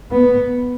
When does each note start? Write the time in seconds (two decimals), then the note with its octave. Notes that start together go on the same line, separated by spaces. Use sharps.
0.11 B3